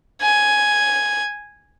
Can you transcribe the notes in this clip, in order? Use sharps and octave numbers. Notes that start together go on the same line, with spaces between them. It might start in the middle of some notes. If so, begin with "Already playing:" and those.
G#5